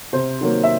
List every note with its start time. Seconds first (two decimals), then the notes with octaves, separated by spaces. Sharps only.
0.13 C3 C5
0.41 D#3 F#3 A#3
0.63 E5